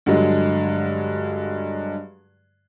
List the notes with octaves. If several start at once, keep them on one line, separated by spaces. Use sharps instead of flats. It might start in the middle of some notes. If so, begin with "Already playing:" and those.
G2 D3 F#3 G#3